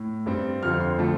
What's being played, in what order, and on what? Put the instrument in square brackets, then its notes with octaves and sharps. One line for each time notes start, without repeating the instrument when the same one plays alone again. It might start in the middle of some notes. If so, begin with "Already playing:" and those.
Already playing: [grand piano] A2
G2 G3 C4
F2 D3 F3 C4 F6
C6
D3 F3 A3 C4 A5